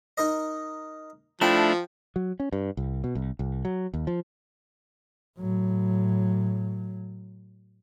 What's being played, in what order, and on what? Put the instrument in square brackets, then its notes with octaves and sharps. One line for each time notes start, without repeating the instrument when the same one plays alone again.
[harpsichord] D#4 A#4 D#5
[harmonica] F3 [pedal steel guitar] A3 D4 E4 [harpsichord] G5
[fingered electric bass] F#3
C#4
G2
C2
B2
C2
C2
F#3
D#2
F3
[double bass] A2 F#3